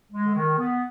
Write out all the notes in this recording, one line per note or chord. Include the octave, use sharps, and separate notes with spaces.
G#3
D3
D#3
B3